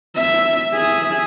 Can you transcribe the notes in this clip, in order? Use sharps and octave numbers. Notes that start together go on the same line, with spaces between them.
E5
G#4 E5